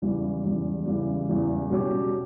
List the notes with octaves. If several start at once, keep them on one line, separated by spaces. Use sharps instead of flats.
E2 C#3 E3 G3
E2 C#3 E3 G3
E2 C#3 E3 G3
E2 C#3 E3 G3
B2 G3 C#4 G4